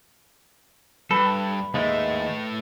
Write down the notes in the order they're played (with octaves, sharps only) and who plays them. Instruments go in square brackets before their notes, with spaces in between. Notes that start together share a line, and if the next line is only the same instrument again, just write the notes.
[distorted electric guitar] G2 [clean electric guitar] A4 [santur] B4
[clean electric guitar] D#2 G#3 [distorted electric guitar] A3 E4